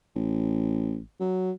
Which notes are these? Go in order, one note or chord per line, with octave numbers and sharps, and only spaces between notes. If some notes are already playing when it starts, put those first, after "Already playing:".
A1
F#3